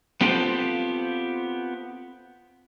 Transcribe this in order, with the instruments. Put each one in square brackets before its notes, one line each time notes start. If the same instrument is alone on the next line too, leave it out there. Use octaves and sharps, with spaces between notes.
[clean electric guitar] B3 C4 F4 G4 A4 C5